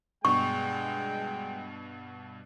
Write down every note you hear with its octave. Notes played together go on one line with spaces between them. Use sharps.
G2 B2 G#3 G5 C#6